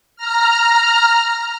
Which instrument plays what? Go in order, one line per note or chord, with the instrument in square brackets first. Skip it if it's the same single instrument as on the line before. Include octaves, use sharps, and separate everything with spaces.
[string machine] A#5 F6